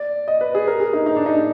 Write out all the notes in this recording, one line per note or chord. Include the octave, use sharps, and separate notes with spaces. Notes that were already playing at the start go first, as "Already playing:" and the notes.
Already playing: D5
D#5
B4
G#4
A#4
G#4
D#4
D#4
D4
D#4